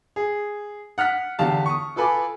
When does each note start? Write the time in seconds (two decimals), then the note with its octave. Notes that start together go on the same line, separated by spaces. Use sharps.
0.16 G#4
0.98 F#5 F6 F#6 B6
1.39 E2 D3 G4 F5 A5
1.66 C#6 D#6
1.96 F4 A4 B4 G#5 B5 D6